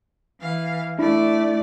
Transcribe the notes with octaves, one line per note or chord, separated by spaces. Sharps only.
E3 F5
A3 D4 E4 D5